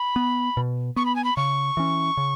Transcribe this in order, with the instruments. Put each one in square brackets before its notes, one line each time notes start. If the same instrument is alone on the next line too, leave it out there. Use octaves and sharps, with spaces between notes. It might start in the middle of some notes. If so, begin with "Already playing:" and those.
Already playing: [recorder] B5
[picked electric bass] B3
B2
[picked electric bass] B3 [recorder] C#6
[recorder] B5
G#5
B5
[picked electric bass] C#3 [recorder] C#6
[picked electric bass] E3 C#4
C#3